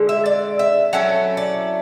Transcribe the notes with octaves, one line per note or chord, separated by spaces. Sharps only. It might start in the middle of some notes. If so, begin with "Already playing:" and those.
Already playing: D3 G#3
E5
D5
E5
F#3 A3 C#4 E4 F#5
D5